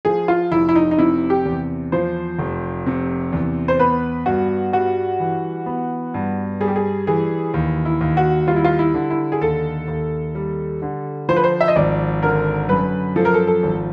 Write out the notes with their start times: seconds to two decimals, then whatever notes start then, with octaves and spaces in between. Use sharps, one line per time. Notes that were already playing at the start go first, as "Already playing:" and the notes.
0.05 F3 G#4
0.28 F4
0.52 F1 E4
0.69 E4
0.75 D#4
0.91 D#4
0.98 C3 E4
1.30 G4
1.45 E2
1.92 F3 C5
2.39 F1
2.86 C3
3.33 E2
3.68 C5
3.80 B3 B4
4.26 G2 F#4
4.73 G3 F#4
5.20 E3
5.66 B3
6.14 G2
6.61 G3 G#4
6.68 G4
6.76 G#4
7.07 E3 G#4
7.54 D#2
7.85 E4
8.01 D#2
8.17 F#4
8.47 G3 F4
8.56 E4
8.64 F4
8.79 E4
8.94 D3
9.10 E4
9.32 G#4
9.41 D#2 A4
9.88 D#2
10.35 G3
10.82 D3
11.29 F3 C5
11.36 B4
11.44 C5
11.61 E5
11.68 D#5
11.76 G#1 D5
12.22 D3 A#4
12.69 F#2 B4
13.16 F3 A4
13.25 A#4
13.34 A4
13.47 A4
13.63 G#1